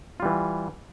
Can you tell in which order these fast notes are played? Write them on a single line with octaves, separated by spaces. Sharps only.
F4 G3 E3